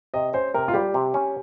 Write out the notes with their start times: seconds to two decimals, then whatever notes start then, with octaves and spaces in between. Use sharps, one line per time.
0.14 C3 D#5
0.33 C#4 C5
0.54 C3 A#4
0.68 F4
0.74 G3 G4
0.94 C3
1.14 C#4